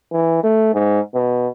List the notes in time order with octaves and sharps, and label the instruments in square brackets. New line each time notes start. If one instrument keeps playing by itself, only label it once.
[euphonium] E3
A3
G#2
B2